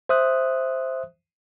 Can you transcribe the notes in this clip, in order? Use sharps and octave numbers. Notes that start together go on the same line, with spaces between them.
C5 E5 D#6 F#6